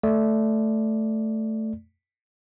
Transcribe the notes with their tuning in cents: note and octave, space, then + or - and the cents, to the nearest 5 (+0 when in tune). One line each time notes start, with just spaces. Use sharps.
A3 +0 D5 +0